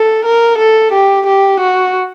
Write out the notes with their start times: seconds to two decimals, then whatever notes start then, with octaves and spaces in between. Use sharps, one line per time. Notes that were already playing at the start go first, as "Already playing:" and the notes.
Already playing: A4
0.25 A#4
0.58 A4
0.92 G4
1.26 G4
1.60 F#4